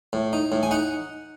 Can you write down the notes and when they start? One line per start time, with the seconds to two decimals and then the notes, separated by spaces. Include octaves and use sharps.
0.13 A2
0.33 D#4
0.52 A2
0.63 G#5
0.71 D#4 F#5